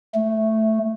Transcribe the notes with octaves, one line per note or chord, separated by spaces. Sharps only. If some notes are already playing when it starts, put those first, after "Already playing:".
A3